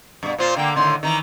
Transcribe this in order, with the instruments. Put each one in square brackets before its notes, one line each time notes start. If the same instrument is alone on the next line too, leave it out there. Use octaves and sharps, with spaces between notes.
[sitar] G2 B2
[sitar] A#2 F4 [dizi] C5
[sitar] D3 A#3 [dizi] G5
[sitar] A2 D3 D#3 [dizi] C6
[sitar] D#3 E3 [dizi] A#5